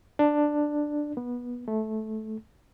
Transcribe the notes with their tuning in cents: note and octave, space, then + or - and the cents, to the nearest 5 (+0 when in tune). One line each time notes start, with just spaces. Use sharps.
D4 +10
B3 -20
A3 -15